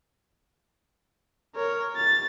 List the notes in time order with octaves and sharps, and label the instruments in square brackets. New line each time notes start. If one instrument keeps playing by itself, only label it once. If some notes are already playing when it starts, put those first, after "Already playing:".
[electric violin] A#4 C#5
A6